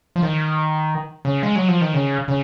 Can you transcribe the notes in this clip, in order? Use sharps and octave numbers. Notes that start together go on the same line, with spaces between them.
F3
D#3
C#3
G#3
F#3
F3
D#3
C#3
C#3